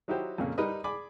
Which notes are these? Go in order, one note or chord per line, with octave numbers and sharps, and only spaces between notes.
F#3 D#4 E4 F#4 G4 C5
F2 A#2 C#3 A#3
G3 D#4 A#4 B4 D#5
G#4 D5 G#5 B5 D6